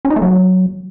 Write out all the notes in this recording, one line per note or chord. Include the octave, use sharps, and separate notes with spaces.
C#4
D#4
A3
F#3